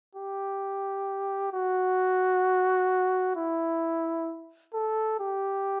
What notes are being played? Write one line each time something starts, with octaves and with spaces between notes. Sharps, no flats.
G4
F#4
E4
A4
G4